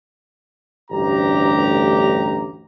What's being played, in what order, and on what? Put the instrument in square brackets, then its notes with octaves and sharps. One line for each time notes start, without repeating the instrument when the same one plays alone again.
[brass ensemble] A1 D2 G2 G4 A#5